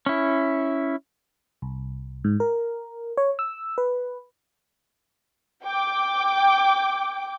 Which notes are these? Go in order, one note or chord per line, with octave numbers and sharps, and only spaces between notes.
C#4 E4
C2
G#2
A#4
C#5
E6
B4
G5 D6